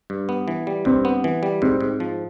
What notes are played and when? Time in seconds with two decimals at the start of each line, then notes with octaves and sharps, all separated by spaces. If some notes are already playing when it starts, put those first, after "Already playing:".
0.10 G2
0.29 B3
0.48 E3
0.67 G3
0.85 G2 C4
1.05 B3
1.24 E3
1.43 G3
1.62 G#2 C4
1.81 G#2
2.00 F3